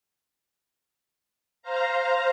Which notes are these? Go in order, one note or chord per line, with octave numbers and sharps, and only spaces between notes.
C5 F5 A#5